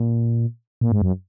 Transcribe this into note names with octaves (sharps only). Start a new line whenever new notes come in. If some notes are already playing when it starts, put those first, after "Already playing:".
Already playing: A#2
A#2
G#2
F#2